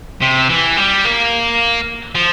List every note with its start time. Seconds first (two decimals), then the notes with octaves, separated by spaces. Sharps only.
0.21 C3
0.49 E3
0.77 G3
1.05 A#3
2.15 F3